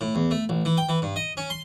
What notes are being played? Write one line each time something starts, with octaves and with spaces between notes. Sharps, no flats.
A2
E2
A3
A1
E3
G5
E3
G2
D#5
C#4
C6